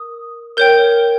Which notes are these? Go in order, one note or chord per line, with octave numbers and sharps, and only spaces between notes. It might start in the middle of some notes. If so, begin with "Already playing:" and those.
Already playing: A#4 D#6
A#4 C#5 G5 G6